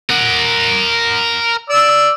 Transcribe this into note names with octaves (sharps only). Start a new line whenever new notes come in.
A#4 F#5
D5 E6